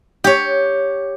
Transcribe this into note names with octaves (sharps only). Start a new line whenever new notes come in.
G4 C#5